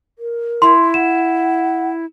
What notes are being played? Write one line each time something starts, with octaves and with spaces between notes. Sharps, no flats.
A#4
E4 C6
F#5 E7